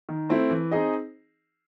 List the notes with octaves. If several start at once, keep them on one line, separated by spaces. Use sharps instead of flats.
D#3
A3 C4 E4
E3
C4 D#4 G#4 D#5